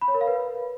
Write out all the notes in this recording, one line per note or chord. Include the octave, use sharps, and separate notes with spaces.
B5
C#5
A#4
F5
B4